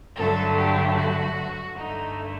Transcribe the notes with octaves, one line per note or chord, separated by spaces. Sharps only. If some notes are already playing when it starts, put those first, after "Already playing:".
G2 D3 F#3 A3 A4
G4
F#4
G2 D3 A3 D#4